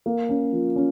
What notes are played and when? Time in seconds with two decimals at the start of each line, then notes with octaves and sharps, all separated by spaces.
0.06 A#3
0.29 C#4
0.52 F3
0.76 C#4